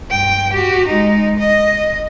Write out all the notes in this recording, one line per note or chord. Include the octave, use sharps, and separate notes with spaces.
G2 G5
F#4 G4
G#3 D#4
D#5